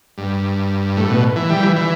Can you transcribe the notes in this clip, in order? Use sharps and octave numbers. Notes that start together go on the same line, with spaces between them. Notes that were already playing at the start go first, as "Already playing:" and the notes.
G2
A2
B2
E3
G3
E3
E3